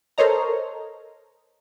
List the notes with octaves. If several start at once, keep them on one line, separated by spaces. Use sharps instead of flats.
A4 A#4 C5 C#5 D#5 A#5